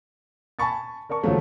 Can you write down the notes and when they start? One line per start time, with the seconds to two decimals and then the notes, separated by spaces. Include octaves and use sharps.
0.59 G#5 A5 B5 C#6 A6
1.09 A#4 D5 A5 C#6
1.23 D#2 C#3 F3 F#3 A3